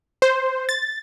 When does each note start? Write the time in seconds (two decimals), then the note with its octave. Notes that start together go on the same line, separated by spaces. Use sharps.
0.22 C5
0.69 A6